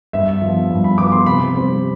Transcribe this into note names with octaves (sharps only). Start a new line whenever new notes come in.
G2 E5
F3 B3
G2
B5
F3 B3 D6
C6
C3 B5
G3 C4